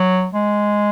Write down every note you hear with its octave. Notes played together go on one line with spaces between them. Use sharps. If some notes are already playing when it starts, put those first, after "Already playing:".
Already playing: F#3
G#3